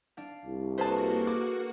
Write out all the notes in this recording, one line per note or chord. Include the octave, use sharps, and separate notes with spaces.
D4 F5
C2
A#3 F#4 G#4 A4 B4 C5 A5
D6